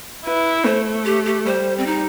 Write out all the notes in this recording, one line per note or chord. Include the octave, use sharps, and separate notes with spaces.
E4 B4
A3 C5
G4
G4
G3 C5
C4
D#4